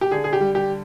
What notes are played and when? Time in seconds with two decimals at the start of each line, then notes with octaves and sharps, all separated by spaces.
0.01 G4
0.11 D3 G#4
0.24 G#4
0.33 G4
0.40 G3
0.55 G4